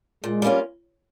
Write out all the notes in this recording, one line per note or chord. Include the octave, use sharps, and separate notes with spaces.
A#2 G#3
G3 A#3 C#4 F4